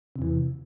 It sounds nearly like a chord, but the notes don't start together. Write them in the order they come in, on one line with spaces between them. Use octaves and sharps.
C3 E2 E3